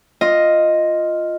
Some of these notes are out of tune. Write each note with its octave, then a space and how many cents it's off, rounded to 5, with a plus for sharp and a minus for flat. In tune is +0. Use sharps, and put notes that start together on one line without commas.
F4 +0 D#5 +0